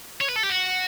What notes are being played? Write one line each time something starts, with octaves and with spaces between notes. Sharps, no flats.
C#5
B4
A4
G4
F#4